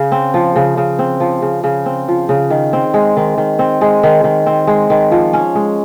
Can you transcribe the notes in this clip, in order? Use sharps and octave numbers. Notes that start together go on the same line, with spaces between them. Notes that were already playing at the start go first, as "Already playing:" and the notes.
Already playing: C#3
C4
F3
C#3
C#3
C4
F3
C#3
C#3
C4
F3
C#3
D#3
C4
G#3
D#3
D#3
C4
G#3
D#3
D#3
C4
G#3
D#3
F3
C#4
G#3